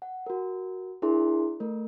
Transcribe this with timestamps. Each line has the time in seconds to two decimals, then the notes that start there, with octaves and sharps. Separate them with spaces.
0.02 F#5
0.27 F#4 A#4
1.02 D4 E4 G#4 A#4 C6
1.60 A3 A#4